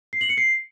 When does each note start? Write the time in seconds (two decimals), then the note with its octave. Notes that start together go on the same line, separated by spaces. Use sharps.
0.13 C7
0.21 F#7
0.29 C#7
0.38 C7